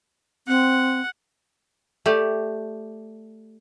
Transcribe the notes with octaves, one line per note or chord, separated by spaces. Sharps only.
C4 F#5
A3 G4 D5